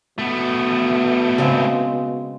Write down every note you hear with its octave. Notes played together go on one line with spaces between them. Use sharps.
B2 A3 B3
C#3 G#3 C4